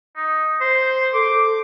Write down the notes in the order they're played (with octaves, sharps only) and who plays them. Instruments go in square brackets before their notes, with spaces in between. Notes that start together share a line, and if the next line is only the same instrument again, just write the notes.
[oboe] D#4
C5
[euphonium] A4 [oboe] D6